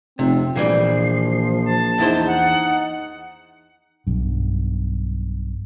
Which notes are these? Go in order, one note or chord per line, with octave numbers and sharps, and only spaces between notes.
F1 C3 C4
A#1 A#2 E3 F3 G3 C7
A5
E2 D#4 E4 C5
F#5
B1 G2